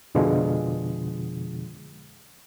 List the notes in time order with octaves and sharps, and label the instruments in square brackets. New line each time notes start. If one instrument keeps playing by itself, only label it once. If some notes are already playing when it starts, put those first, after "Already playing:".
[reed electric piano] F2 B2 D3 F3 G#3